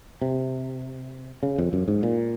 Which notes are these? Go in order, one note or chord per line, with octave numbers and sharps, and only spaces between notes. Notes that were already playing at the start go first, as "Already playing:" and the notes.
C3
C#3
F2
F#2
G#2
A#2